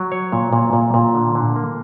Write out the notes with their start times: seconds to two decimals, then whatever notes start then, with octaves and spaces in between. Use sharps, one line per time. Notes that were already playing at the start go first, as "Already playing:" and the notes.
Already playing: F#3
0.12 C#5
0.32 A#2
0.53 A#2
0.73 A#2
0.94 A#2
1.15 D3
1.35 D3
1.56 A#3